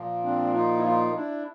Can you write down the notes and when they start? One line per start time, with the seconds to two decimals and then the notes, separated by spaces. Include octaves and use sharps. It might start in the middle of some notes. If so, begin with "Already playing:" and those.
Already playing: A#2 F3 A#3
0.24 C4 D4
0.54 D#4 F4
0.78 E4
0.85 D#4 F4
1.16 D4 E4